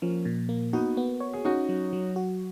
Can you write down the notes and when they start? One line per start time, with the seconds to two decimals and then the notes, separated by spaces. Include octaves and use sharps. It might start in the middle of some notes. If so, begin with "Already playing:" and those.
0.02 F3 A#3 C#4
0.25 A#2
0.49 A#3
0.73 B3 D#4 F#4
0.97 B3
1.21 C#5
1.33 G#4
1.45 C#4 D#4 F#4
1.69 F#3
1.93 F#3
2.16 F#4